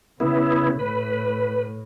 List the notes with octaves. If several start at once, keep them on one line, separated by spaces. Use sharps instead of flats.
C#3 B3 E4
A2 B4